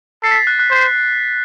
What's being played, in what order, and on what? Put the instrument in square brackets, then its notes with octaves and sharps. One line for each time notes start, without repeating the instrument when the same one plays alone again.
[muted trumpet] A4 [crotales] C7
[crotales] B6
A6
F#6
F#6
[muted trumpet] C5